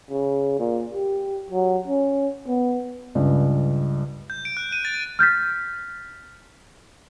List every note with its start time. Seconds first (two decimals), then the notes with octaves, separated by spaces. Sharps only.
0.10 C#3
0.59 A#2
0.94 G4
1.50 F#3
1.87 C#4
2.48 B3
3.15 C#2 G2
4.30 G6
4.45 D7
4.57 F#6
4.72 D#7
4.85 A6
5.19 F6 G6 A6 B6